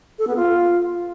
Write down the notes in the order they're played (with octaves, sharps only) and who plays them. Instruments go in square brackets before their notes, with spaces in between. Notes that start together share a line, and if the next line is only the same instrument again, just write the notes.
[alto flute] A4
B3
F4